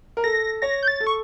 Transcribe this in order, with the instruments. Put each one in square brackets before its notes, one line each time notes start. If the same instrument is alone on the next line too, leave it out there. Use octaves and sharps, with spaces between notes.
[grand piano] A#4
[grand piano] A4 [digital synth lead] A#6
[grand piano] C#5 [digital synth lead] A#6
[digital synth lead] G6
A6
[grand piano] A4
[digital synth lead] C#6